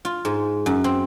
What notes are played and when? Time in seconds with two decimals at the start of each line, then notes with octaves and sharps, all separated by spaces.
0.05 F4
0.25 G#2
0.66 F#2
0.84 C4